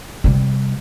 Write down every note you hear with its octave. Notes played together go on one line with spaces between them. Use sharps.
C3 G3